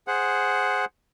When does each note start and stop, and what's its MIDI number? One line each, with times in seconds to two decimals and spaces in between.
0.08 0.85 68
0.08 0.85 72
0.08 0.85 78